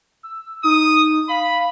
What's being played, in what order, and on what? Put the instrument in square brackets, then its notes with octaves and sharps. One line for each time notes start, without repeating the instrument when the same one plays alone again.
[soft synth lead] E6
[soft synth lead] D#4 [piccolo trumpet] D#6
[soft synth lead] F5 [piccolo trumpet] B5